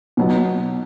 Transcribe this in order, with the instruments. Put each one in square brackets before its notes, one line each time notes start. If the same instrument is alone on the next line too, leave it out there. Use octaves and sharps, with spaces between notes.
[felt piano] B2 F#3 B3 F#4